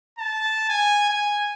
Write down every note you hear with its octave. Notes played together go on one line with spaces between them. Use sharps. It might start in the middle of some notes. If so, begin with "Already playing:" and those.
A5
G#5
G#5